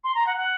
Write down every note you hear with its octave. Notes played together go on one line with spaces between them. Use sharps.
C6
A#5
F#5
F#5